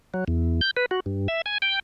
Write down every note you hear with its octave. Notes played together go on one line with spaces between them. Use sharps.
F#3
E2
G6
B4
F#4
G2
E5
G#5
G5